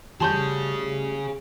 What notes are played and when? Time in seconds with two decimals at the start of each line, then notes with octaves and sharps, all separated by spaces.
0.20 G3 A3 F#4 G#4 C#5 A5 C6 G6